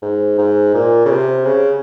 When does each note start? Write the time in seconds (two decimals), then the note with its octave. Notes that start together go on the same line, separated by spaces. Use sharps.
0.02 G#2
0.38 G#2
0.74 A#2
1.05 C#3
1.10 C3
1.45 C#3